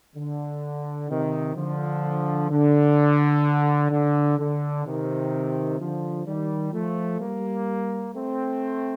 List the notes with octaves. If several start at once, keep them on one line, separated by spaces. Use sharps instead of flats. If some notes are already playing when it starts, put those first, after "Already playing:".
D3
C3 D#3
D3 F3
D3
D3
D3
C3 D#3
D3 F3
D#3 G3
F3 A3
G3 A#3
A3 C4